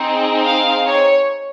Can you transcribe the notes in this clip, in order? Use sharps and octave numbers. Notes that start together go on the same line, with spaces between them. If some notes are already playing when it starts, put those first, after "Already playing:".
Already playing: C4 D#4 G#4
F5
C#5